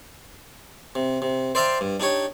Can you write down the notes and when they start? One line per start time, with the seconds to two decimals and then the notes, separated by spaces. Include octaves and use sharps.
0.95 C3
1.22 C3
1.55 C5 D5 E5 F5 G5 A#5
1.81 G2
2.00 D4 D#4 G4 C#5